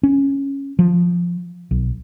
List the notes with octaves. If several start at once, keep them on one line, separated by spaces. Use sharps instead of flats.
C#4
F3
B1